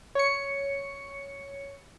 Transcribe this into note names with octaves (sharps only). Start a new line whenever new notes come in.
C#5 C#7